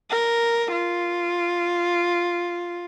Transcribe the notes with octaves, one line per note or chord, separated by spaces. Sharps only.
A#4
F4